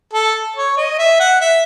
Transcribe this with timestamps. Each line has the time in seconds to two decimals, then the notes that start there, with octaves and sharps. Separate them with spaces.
0.13 A4
0.56 C#5
0.77 D#5
0.98 E5
1.20 F#5
1.41 E5